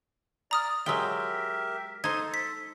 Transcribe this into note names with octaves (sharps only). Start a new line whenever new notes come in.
D5 A#5 D#6 F6
F#3 G#3 G4 A#4 E5 G5
D#4 A4 C5 G#6
B6